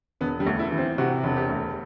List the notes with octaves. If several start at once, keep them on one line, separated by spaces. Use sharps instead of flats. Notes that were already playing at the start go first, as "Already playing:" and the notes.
E1 B3
G3
D2
E4
E3
C4
C3 F#4
E1
G4
D2